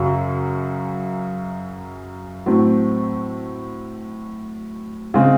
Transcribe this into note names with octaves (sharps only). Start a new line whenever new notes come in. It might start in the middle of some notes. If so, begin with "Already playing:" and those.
Already playing: F#2 C#3 F#3
A2 F#3 A3 C4
C#3 G#3 C4